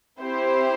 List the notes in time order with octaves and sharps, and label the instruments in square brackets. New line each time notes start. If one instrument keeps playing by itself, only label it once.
[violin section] C4 E4 G4 C5